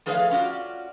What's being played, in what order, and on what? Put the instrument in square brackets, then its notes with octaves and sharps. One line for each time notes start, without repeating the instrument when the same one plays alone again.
[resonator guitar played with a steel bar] F3 A3 G#4 B4 C#5 F5
C#4 D4 F4 F#4 D5